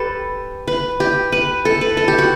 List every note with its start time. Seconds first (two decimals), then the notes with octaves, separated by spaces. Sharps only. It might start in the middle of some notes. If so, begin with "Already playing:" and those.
Already playing: G4 A4 B4
0.68 B4
1.00 G4
1.32 B4
1.65 A4
1.81 B4
1.97 A4
2.08 G4
2.18 F#4